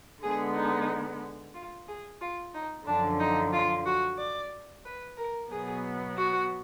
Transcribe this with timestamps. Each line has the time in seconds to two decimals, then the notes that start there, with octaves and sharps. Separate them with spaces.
0.23 D3 G#3 B3 G#4
0.56 D#4
1.55 F4
1.88 G#4
2.21 F4
2.54 D#4
2.87 F#2 D3 F3 D4
3.20 D#4
3.53 F4
3.86 F#4
4.18 D5
4.85 B4
5.18 A#4
5.51 B2 F#3 B3 G#4
6.17 F#4